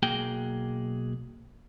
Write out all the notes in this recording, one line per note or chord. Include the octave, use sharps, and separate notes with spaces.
B1 A#3 F#4 G#4 G5